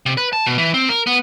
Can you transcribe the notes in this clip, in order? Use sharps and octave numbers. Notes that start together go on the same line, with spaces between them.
C3
B4
A5
B2
E3
C4
A#4
B3